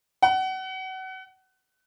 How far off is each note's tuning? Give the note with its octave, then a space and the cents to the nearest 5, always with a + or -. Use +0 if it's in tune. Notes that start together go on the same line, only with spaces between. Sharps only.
F#5 +30